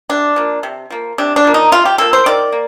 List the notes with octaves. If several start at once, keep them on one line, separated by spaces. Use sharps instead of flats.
C3 D4
F3 A#3
C3
F3 A#3
C3 D4
D4
F3 A#3
D#4
C3 F4
G4
F3 A#3 A4
C5
D#3 D5
A#3